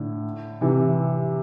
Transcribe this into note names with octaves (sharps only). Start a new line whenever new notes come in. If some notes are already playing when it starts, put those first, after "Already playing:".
Already playing: A2 D3
C3 E3